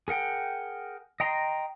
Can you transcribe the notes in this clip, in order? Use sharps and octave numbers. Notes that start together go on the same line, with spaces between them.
G#4 A#4 F#5 G5
D#5 G5 A#5 C6